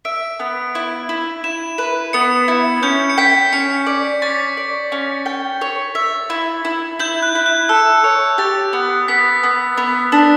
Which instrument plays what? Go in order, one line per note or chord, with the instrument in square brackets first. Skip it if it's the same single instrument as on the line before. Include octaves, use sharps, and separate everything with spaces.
[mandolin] E5 [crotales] D7
[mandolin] B3
E4
E4
[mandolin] E4 [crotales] E7
[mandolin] B4
[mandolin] B3 [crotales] C#7
[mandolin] E4
[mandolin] C#4 [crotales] G6
[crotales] C#7
[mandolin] G5 [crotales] B6
[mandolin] C#4 [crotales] C#7
[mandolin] D5
[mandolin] C#4 [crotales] A6
[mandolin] D5
C#4
G5
C#5
E5
E4
E4
[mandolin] E4 [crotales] G6
[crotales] F#6
[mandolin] E4
[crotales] F#6
[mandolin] A4 [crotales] E6
[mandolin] C#5
[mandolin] G4 [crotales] A6
[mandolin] B3
[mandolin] B3 [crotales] B6
[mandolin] B3
B3
D4